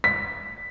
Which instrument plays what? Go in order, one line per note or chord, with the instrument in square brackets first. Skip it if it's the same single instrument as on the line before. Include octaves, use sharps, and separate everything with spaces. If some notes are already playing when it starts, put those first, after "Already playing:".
[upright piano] B6